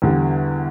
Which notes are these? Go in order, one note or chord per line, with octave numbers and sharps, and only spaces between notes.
E2 D3 G3